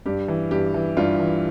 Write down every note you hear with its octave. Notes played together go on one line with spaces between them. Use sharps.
G2 G4
E3
G2 G4
E3
G2 F4
E3